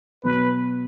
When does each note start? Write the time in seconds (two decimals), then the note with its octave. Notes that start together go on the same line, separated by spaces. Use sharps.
0.24 B2 F#3 B3 B4